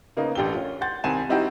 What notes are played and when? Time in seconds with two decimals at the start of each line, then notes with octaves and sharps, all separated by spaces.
0.17 C#3 A#3 B3 D#4
0.35 A1 D4 G4 A4 G7
0.54 C#4 F4
0.81 F#5 C6 G6 A6
1.04 C2 D#3 C4 G#5 A5 E7
1.29 G3 C4 D#4 E4 F#4 G4